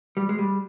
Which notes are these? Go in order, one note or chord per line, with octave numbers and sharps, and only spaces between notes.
G3
G#3
G3